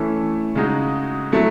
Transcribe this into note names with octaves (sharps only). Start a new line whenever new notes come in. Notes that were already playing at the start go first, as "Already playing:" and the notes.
Already playing: E3 A3 C#4 E4
C#3 G#3 D#4 F#4
F#3 A3 E4